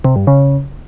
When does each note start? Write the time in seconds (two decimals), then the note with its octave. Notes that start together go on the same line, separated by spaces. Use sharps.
0.04 C3
0.16 G2
0.27 C#3